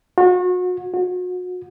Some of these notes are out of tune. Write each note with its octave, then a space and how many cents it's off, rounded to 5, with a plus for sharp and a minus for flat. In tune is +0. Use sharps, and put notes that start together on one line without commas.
F#4 -35
F#4 -35